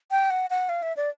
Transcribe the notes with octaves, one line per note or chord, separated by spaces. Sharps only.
G5
F#5
F#5
F5
E5
D5